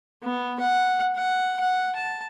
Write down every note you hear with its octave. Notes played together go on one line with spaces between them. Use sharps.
B3
F#5
F#5
F#5
A5